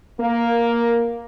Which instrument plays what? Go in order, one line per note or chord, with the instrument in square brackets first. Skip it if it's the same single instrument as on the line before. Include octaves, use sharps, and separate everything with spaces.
[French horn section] A#3